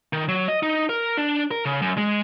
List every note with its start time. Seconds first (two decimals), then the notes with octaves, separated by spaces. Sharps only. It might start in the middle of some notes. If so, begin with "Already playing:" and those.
0.13 D#3
0.28 F#3
0.48 D#5
0.63 D#4
0.89 A#4
1.17 D4
1.51 A#4
1.65 C#3
1.82 F#2
1.97 G#3